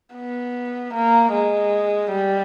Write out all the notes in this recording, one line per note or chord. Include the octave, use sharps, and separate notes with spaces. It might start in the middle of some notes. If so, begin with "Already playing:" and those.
B3
A#3
G#3
G3